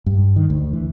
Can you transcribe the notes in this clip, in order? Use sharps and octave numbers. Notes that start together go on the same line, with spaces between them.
G2
D#3
D2
E3